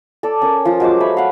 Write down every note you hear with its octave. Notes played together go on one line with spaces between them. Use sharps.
A4 D5
C#4 A#4
F3 F4
F#3 G#3 C5 D6
A3 C#5 B5
F5 F#5